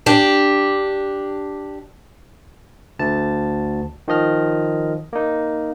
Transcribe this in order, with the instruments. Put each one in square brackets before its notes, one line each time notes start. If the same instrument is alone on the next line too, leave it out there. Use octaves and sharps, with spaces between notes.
[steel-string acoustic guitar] D4 G4
[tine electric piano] D2 A5
D#3 F3 D#5 F6
A#3 D#4